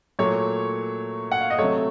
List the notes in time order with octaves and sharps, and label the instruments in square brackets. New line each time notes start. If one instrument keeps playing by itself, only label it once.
[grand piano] A#2 F#3 A3 C#5
F#5
F5
D#5
C3 F#3 A3 C#5